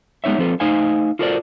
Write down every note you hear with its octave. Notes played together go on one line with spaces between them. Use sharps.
G#3 B3 D#4 C#5 E5
F3 C4 A4 B4
A3 D#4 C5 F5 G#5
F4 F#4 A4 A#4 C5 D5